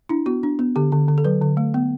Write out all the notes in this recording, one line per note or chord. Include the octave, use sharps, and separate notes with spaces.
D4 E4
B3 F#4
D4
B3
D3 G4
D3
D3
A4
F#3 B4
D3
A3
B3